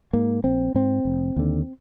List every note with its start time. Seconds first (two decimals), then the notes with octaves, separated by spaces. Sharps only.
0.13 G#2 A#3
0.44 A#1 C4
0.74 G#2 C4
1.05 F1
1.36 D#2 D3